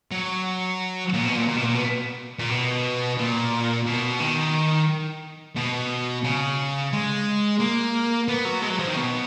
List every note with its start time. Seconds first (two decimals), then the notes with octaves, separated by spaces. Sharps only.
0.12 F#3
1.14 A#2
1.25 B2
1.36 A#2
1.48 A#2
1.56 B2
1.65 A#2
1.73 B2
2.39 A#2
2.50 B2
3.18 A#2
3.86 B2
4.20 D#3
5.56 B2
6.24 C#3
6.93 G#3
7.60 A#3
8.28 B3
8.45 F#3
8.62 G#3
8.70 F#3
8.79 F3
8.88 D#3
8.96 B2